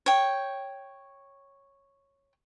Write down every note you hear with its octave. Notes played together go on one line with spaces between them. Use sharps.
C#5 G5